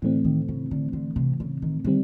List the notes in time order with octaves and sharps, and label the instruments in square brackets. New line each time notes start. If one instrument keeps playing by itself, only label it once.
[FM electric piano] A2 E3 A3 C4 [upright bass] D3
[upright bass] D#3
C#3
D3
D3
C3
C#3
D#3
[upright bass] D3 [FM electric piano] D#3 G3 C4